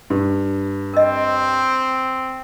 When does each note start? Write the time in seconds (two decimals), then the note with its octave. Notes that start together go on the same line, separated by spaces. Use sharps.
0.10 G2
0.94 C4 A#4 D#5